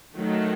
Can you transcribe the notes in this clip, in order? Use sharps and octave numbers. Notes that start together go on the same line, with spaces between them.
D#3 F#3 A3